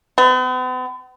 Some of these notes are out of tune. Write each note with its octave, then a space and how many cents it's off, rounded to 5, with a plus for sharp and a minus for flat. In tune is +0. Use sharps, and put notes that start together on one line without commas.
B3 +45